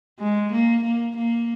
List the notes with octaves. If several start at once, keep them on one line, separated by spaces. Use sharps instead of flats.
G#3
A#3
A#3
A#3